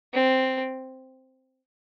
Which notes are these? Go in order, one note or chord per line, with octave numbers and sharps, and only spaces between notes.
C4